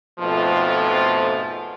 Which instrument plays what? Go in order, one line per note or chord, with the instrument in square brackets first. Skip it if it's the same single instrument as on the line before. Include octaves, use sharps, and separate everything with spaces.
[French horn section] F2 G#2 B2 F3 A3 F4